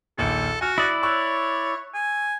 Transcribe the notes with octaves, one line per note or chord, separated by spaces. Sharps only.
A#1 D#2 A4 C#7
F#4 G#5 F6
E4 D5 D#6 F#6
C#5 C#6 E6 F#6
G#5